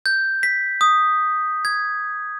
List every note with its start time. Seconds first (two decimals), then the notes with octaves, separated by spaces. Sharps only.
0.06 G6
0.43 B6
0.81 D#6
1.65 G#6